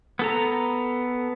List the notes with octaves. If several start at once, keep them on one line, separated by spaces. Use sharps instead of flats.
B3 A4 A#5